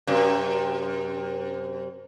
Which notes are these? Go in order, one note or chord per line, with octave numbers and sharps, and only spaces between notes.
F#2 C3